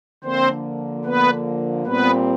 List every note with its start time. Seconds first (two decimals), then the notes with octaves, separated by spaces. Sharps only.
0.24 D3 F3 A#3 C4 C5
1.05 B3 B4
1.86 A#2 G3 B3 C4 B4